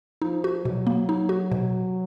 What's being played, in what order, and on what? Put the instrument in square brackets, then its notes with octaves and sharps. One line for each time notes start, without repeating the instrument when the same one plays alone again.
[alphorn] F3 [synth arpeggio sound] D#4
[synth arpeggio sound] F#4
[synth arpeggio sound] B2 [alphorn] F#3
[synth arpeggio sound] A#3
D#4
F#4
B2